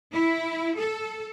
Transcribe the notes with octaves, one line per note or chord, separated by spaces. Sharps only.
E4
A4